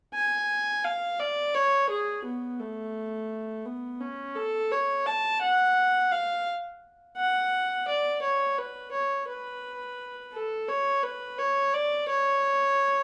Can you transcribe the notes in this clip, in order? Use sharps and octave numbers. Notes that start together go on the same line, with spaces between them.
G#5
F5
D5
C#5
G#4
B3
A3
B3
C#4
A4
C#5
A5
F#5
F5
F#5
D5
C#5
B4
C#5
B4
A4
C#5
B4
C#5
D5
C#5